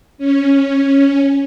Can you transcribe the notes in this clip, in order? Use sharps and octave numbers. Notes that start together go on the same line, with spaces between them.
C#4